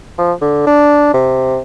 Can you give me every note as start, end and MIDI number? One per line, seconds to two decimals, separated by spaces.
0.18 0.33 53
0.41 0.66 50
0.67 1.09 62
1.14 1.60 48